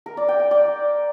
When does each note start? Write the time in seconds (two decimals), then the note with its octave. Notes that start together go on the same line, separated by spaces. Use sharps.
0.06 A#4
0.17 D5
0.28 G5
0.40 G5
0.51 D5